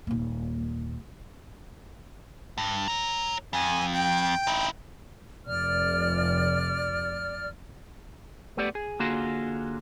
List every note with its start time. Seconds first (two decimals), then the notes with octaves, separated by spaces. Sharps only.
0.07 D#1 A#3
2.58 G2
2.88 C#5 A#5
3.53 F2 G#5
3.93 G5
4.47 D#4 E4
5.46 F1 D5 F6
8.57 A3 B3 G4 D5
8.75 G#4
8.99 D3 A#3 F4 F#4 G#4